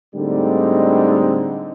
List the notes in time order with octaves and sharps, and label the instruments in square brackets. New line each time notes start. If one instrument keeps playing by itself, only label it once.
[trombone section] A2 D3 G3 G#3 C4 D#4